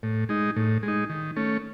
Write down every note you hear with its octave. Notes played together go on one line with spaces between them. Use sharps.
A2
G#3 D#4
A2
G#3
D#4
D#3
A3 C#4